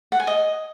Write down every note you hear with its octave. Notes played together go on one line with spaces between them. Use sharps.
F#5
G#5
D#5